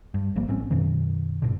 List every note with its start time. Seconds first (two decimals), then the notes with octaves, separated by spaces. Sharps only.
0.14 G2
0.36 G#1 F3 G3 A#3
0.48 A1 C4 C#4
0.71 F#2 B2 D#3
1.42 F#1 G2 B2 D3